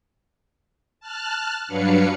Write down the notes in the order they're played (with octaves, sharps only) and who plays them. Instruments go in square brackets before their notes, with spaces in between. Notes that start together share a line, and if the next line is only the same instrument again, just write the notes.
[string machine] A5 F6 F#6
G2 F#3 D4 B4 F5 C#7